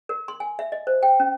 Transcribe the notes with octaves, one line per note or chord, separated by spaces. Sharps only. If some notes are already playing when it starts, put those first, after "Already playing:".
A#4
C6
G#5
E5
D#5
C5
G5
C#4